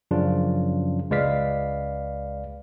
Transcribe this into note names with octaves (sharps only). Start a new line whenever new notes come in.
F#2 C#3 F3 D4 F4
C#2 G#3 B4 D5 F5 B6